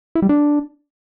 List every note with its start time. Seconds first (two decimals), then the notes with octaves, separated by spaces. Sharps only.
0.15 E4
0.22 G3
0.29 D4